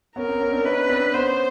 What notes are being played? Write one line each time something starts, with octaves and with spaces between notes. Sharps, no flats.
B3 C#4 A#4
C4
B3 C#4
C4 D4
C#4 D#4 B4
C4 D4
B3 C#4 C5